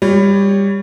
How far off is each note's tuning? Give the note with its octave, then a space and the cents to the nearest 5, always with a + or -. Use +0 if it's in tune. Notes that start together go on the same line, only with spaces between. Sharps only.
G3 +20 C#5 +15